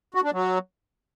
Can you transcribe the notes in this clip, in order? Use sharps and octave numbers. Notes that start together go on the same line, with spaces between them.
F#4
D4
F#3